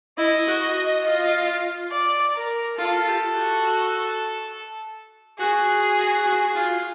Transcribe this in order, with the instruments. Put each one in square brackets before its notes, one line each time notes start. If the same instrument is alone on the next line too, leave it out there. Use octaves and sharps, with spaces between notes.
[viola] E4 [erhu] D#5
[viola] F#4
F4
[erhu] D5
A#4
[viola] F4 [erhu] A4
[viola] G4
F#4
[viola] F#4 [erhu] G#4
[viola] F#4
F#4
F#4
F4